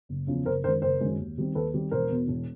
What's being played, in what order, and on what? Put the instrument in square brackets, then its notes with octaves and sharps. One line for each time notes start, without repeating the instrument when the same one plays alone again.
[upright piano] F#1
E2 C#3 F3
F#1 A#4 C5
F#2 D#3 G#3 A#4 C5
F#1 A#4 C5
F#2 D#3 G#3
D#2
D#3 G3 C4
D#2 A4 B4
D#3 G3 C4
E1 A#4 C5
E2 B2
E1